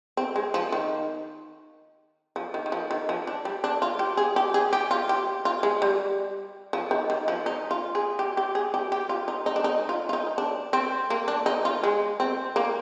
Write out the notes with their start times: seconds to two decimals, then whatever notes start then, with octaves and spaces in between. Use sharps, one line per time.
0.17 C4
0.36 G#3
0.54 F3
0.72 D#3
2.36 F3
2.54 D#3
2.66 D#3
2.72 F3
2.91 D#3
3.09 F3
3.27 D4
3.45 G3
3.64 D4
3.82 F4
3.99 G4
4.17 G#4
4.36 G4
4.54 G#4
4.73 G4
4.91 F4
5.09 G4
5.45 F4
5.63 G#3
5.82 G3
6.73 F3
6.91 D#3
7.10 D#3
7.28 F3
7.46 D#4
7.71 F4
7.95 G#4
8.19 G4
8.37 G4
8.55 G#4
8.74 G4
8.92 G4
9.09 F4
9.28 D#4
9.46 D#4
9.56 D4
9.64 D#4
9.89 F4
10.09 F4
10.13 D#4
10.38 D4
10.73 C4
11.10 A#3
11.28 D4
11.46 D#4
11.65 F4
11.83 G#3
12.20 C4
12.56 A#3